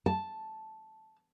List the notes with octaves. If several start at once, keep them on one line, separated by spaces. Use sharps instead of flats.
A5